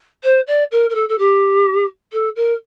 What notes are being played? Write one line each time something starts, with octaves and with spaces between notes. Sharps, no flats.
C5
D5
A#4
A#4
A4
A4
G4
A4
A#4